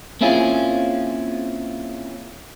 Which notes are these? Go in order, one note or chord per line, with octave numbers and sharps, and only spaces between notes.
A#3 C4 C#4 E4 F4 G#4